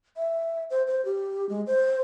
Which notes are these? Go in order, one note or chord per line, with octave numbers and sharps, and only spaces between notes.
E5
C5
C5
G4
G#3
C5